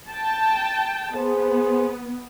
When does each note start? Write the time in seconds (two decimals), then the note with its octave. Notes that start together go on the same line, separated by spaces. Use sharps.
0.10 G5 A5
1.16 B3 G#4 C5